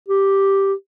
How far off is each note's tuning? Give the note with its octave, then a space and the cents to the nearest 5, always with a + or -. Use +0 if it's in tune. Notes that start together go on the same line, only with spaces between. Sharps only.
G4 -5